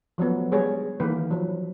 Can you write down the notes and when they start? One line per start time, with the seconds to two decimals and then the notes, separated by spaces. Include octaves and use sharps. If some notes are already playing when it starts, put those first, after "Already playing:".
0.18 F3 F#3 A3 B3
0.52 G3 G#3 G#4 B4 C#5
1.00 D#3 E3 A3 A#3 B4
1.31 F3 F#3